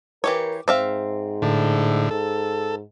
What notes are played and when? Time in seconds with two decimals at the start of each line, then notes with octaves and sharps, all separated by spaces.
0.24 E3 G4 A#4 C#5
0.68 G#2 C4 E5 F5
1.42 A2 D3
2.11 G#2 A4